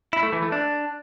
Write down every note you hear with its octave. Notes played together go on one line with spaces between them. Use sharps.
E4
A3
E3
A3
D4